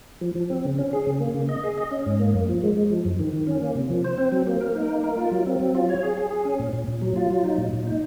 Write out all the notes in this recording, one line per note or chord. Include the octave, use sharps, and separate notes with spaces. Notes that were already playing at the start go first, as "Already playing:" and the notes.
F3
F3
C4
C#3
C#4
G#4
C#3
A#3
C#3
D#5
G#4
D#5
C#4
G#2
A#3
F#2
F3
G#3
G#3
F3
F#2
D#3
D#3
C#4
A#3
C3
F3
C5
C4
F#3
A#3
A#4
D#4
A#3
A#4
F4
F#3
C4
F#3
F4
C#5
G#4
G#4
G#4
C#4
A#2
A#2
A#2
F#3
F4
F#3
D#4
A#2
A#2
D#4